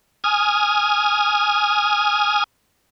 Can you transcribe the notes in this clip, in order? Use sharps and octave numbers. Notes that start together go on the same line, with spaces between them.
G#5 D#6 F6